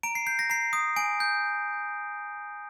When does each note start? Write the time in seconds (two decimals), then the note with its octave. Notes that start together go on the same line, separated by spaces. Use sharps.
0.03 A#5 D7
0.15 C7
0.27 G6 C7
0.39 A#6
0.50 A#5 C7
0.73 D#6
0.96 G#5 D7
1.20 G6